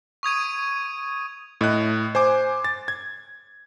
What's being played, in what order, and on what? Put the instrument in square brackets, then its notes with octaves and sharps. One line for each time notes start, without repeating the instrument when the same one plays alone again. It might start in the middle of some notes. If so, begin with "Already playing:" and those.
[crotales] C#6 D#6 G#6 D#7
[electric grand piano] A2 D#5 F#6
C5 G#5 D6
A6
G#6